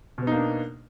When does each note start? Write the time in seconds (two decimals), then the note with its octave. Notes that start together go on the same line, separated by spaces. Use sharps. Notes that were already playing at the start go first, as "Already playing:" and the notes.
0.18 B2
0.23 B3
0.27 D#4
0.32 A#3
0.36 D4